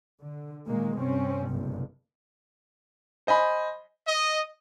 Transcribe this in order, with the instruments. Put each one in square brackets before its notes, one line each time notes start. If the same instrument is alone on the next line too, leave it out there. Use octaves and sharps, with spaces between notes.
[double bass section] D3
A#2 D#3 G#3 A#3
G2 C3 C4 C#4
F#1 B1 G2 C3
[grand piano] C5 D#5 G#5 B5
[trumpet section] D#5